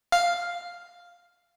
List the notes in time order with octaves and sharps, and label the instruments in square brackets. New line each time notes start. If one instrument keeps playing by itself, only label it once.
[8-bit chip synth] F5